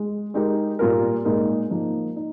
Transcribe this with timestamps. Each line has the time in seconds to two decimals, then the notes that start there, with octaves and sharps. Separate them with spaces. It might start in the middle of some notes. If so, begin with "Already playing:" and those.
Already playing: G#3
0.34 G#3 D#4 G4 A#4
0.79 A#2 G3 A#3 F4 A#4
1.24 A#2 G#3 D#4 A#4
1.70 F3 A#3 D#4
2.16 D#4